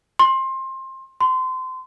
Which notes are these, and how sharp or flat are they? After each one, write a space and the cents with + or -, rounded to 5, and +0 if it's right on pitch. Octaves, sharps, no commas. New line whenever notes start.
C6 +20
C6 -25